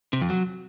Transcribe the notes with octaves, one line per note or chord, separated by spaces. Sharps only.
C3
F2
F#3